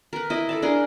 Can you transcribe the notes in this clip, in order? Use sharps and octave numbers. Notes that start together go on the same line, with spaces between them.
A#4 B4
E4 D#5
A4 D5 A5
D4 G#4 A#4 D#5